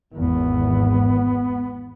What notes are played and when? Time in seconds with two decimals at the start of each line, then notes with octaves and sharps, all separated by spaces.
0.13 G#1 E2 B3